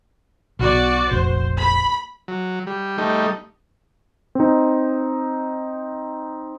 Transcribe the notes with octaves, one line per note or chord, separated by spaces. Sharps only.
B1 B2 F#4 D5
F1 A#1 C5
B5
F#3
G3
G3 A3 D#4
C4 D#4